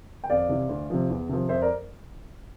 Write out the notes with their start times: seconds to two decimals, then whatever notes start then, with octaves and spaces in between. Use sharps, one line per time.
0.24 G5
0.30 F2 D5 F5
0.49 C3 E3
0.69 D2
0.90 C3 F3
1.10 E2
1.29 C3 F3
1.49 F2 C5 E5
1.62 A#4 D5